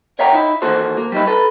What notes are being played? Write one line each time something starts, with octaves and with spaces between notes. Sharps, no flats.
A#4 C#5 E5 F#5 G5 A#5
D#4 E4
D#3 E3 A#3 F#4 A4 C5
A#3
G3 D#4 E4
A4 B4